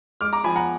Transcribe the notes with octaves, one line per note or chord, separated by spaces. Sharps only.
G#3 D6 F6
A#5 D6
F3 G#5 B5
F#5 A#5